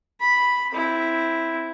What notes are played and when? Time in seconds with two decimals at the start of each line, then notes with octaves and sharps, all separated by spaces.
0.20 B5
0.71 C4 E4